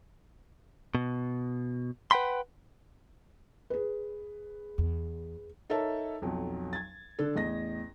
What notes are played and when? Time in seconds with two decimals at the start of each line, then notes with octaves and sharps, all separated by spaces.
0.95 B2
2.11 B4 F#5 G5 B5 C6
3.70 G#4 B4
4.78 E2
5.70 D#4 A4 A#4 C#5 E5 A5
6.22 B1 F2 F#3
6.73 G#6 A6
7.19 D3 D4 A4
7.35 A1 E2 D#5 A#6